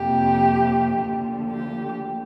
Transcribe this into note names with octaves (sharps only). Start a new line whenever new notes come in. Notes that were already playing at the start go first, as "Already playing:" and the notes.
Already playing: F2 C3 A#3 G4
D2 D3 F3 A#3
G4